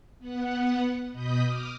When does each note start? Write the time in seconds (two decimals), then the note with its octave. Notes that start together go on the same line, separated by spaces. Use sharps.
0.19 B3 F#5
1.12 B2 D#5 B5 D#6 G6 B6
1.45 D6 D#6 F6